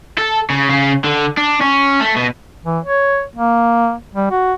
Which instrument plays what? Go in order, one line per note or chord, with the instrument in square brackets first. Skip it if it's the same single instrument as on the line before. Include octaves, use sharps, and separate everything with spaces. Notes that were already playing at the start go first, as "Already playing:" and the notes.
[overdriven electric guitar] A4
C#3
C#3
D3
D4
C#4
A3
B2
[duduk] E3
C#5
A#3
G3
F#4